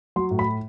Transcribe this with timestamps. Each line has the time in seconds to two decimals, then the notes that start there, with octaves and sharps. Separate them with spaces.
0.16 F#3 C6
0.31 A2
0.39 B5